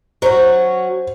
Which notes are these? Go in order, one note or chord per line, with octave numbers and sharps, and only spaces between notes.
F#3 C#4 F#4 C5